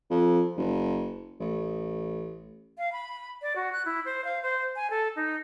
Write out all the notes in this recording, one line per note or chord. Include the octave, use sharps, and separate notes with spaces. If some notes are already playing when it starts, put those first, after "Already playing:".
F2
F#1
A1
F5
B5
D5
F#4
F#6
E4
C5
F5
C5
G#5
A4
D#4